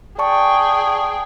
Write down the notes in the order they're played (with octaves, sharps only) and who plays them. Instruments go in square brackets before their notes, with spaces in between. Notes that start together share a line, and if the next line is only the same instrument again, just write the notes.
[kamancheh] G#4 G5 [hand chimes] D5 A5 C#6